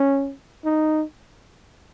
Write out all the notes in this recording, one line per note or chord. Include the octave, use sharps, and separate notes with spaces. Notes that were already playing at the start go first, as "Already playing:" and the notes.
Already playing: C#4
D#4